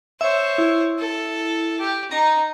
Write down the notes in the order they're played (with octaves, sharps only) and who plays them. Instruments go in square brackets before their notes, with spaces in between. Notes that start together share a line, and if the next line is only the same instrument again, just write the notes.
[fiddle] C5 C#5 [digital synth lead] E5
[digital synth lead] E4
[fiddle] A4
G4
[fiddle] D#4 [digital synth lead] A#5